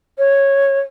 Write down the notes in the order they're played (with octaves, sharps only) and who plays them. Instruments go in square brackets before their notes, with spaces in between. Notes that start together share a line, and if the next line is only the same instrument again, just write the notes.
[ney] C#5